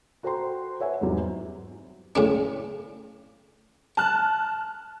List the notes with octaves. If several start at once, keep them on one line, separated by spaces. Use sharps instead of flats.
F#4 A4 C5 G5 A#5 C6
B4 C#5 E5 F#5 G#5
E2 G#2 C3 F#3 G3
A2 C#3 D4
A5 F6 F#6